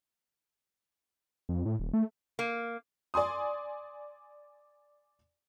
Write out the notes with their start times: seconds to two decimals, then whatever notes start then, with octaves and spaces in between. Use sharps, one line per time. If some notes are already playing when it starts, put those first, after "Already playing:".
1.49 F2
1.65 A2
1.80 D#1
1.93 A3
2.39 A#3
3.14 D5 G#5 C6 D#6